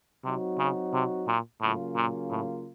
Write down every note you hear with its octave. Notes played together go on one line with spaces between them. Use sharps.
C3 F#3 C4 D#4 F#4
C#3
C3
A#2
A2 C#3 F#3 A#3 C#4 F4
A#2
A2